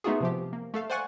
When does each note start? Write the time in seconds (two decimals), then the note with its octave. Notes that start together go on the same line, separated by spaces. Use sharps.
0.04 A3 B3 D#4 F4 F#4 G#4
0.20 C3 F3 G4
0.53 A#3
0.74 A3 A4 F5
0.90 C5 D5 F#5 G#5 C#6 F#6